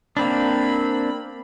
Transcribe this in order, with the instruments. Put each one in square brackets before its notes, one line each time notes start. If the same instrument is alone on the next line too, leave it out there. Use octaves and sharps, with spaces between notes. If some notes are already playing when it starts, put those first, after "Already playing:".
[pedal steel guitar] A#3 C4 D4 [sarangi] B5